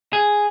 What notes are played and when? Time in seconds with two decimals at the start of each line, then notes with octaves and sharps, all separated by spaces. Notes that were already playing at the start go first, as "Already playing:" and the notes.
0.13 G#4